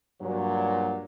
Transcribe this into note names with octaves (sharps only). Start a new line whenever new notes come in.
G2 A#2 F#3